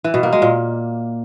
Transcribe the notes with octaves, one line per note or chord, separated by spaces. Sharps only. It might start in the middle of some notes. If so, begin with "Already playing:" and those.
E3
B2
A#3
G#3
A#2